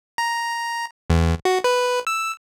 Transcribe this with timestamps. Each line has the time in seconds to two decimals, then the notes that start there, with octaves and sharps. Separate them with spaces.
0.18 A#5
1.10 E2
1.45 F#4
1.64 B4
2.07 E6